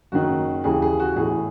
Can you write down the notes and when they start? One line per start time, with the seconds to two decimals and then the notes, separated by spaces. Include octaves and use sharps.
0.12 F#1 F#2 D#3 F#4
0.64 D#2 C#3 E3 G#4
0.82 G#4
1.00 F#4
1.16 B1 A2 E3 G#4